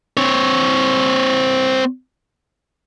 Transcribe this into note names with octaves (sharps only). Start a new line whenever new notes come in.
C4 C#5